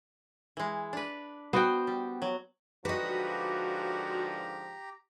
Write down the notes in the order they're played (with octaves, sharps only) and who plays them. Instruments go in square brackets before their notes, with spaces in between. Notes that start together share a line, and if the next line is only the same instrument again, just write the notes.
[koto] E3 G#3
D4 B4
[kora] B3 F#4 G5 [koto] C5
[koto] G3
F#3
[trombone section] G#2 D3 F3 [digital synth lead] F#4 [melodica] G4 A#5 [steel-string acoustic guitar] B4 D#5